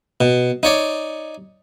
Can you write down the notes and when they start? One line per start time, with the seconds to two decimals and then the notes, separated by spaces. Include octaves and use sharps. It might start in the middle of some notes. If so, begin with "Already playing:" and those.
0.21 B2
0.63 D#4 C#5 D5